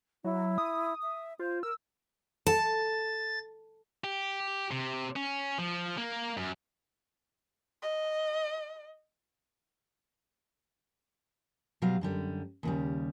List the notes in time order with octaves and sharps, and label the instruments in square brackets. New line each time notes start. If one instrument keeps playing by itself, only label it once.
[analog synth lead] F#3 [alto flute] E4
[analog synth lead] D#6
[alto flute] E5
[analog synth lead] F4 [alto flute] C5
[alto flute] A#4 [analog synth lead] E6
[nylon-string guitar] A4 [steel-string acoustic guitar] A5 [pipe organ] A6
[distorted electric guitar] G4
C3
C#4
F3
A#3
F#2
[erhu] D#5
[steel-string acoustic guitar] B2 F#3 G3 F5
F#2 D3 G3
D#2 C#3 G3